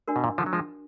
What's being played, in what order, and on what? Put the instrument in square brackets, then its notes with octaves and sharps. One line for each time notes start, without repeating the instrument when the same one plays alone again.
[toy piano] D4 F#4 A#4 D5
[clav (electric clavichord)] B2
A#2
D3 F3
F#3
F3 G#3